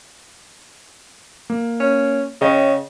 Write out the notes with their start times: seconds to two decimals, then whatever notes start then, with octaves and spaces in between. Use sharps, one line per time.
1.50 A#3
1.80 C#4
2.41 C#3 C#5 D#5 G5